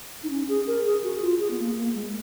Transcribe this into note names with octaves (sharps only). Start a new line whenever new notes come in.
D#4
C#4
G#4
A#4
G#4
F#4
F4
G#4
B3
A#3
A#3
G#3